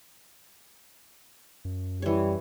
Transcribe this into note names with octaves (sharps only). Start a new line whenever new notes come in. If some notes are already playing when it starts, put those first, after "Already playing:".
F#2
E3 G3 C#5